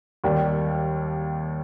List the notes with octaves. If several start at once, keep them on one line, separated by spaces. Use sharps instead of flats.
D#2 D#3 G3